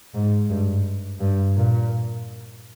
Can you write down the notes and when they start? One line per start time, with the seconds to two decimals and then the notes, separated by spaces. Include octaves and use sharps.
0.14 G#2
0.49 G2
1.21 G2
1.56 A#2